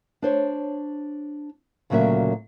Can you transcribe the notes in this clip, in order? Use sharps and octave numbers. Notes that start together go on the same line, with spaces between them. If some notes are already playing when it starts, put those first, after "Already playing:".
D4 C5 C#5
D2 A#2 C#3 F#3 A#4 E5